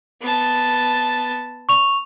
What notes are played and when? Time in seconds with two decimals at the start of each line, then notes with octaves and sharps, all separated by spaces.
0.21 B3 A5
1.69 C#6 F7